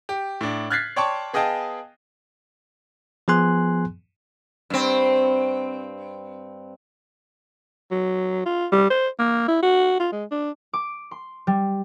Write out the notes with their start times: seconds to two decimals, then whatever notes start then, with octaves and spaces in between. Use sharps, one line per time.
0.09 G4
0.41 A2 D4
0.70 F6 F#6 G#6 A6 B6 C7
0.96 C#5 D5 G5 A5 C6 C#6
1.33 B3 G#4 D#5 F5 G5 A5
3.28 F3 B3 G#4 G#5 C6 F#6
4.70 G2 C4
7.91 F#3
8.46 F4
8.72 G3
8.90 C5
9.19 A#3
9.48 E4
9.63 F#4
10.00 F4
10.12 G#3
10.31 D4
10.73 D6
11.11 C6
11.47 G3